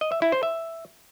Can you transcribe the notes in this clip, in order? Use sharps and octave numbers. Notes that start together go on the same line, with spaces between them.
D#5
E5
E4
C5
E5